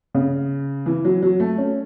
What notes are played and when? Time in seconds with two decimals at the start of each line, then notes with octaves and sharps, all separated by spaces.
0.14 C#3
0.86 E3
1.05 F#3
1.22 F#3
1.40 A3
1.58 C#4